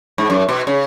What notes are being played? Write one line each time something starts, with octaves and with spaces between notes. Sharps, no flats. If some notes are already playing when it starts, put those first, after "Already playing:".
G#2
F#2
B2
C#3